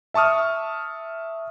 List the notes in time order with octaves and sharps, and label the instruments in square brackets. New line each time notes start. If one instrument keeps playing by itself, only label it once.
[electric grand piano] E5 A5 C#6 D#6 F6